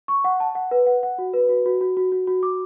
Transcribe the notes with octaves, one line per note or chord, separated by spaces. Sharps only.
C#6
F#5
A5
F#5
B4
F#5
F#5
F#4
B4
F#4
F#4
F#4
F#4
F#4
F#4
D6